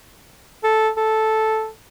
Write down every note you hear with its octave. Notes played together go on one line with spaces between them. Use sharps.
A4
A4